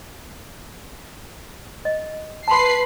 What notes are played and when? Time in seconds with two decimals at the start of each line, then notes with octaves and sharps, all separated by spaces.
1.85 D#5
2.48 B4 A5 B5 C6 C7